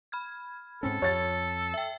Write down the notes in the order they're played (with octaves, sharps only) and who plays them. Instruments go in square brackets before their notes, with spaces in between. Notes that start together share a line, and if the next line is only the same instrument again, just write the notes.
[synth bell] B5 F6 G#6
[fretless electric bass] G#2 C4 C#4 [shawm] A4
[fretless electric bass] F2 [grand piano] C#5 A6
[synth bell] E5 G5